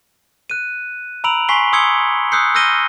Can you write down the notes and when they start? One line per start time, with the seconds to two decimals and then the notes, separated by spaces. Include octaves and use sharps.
0.50 F#6 D#7
1.24 A#5 B5 E6 D7 F7 F#7
1.49 G#5 C6 C#6 B6 C7 G7
1.73 C6 D#6 E6 G#6 C#7 G7
2.32 D#6 E6 F#6 G6 C7 C#7
2.55 E6 F6 G6 A#6 D#7 G7